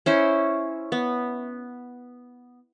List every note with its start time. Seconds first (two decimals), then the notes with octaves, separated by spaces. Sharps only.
0.06 C#4 E4 C5
0.92 B3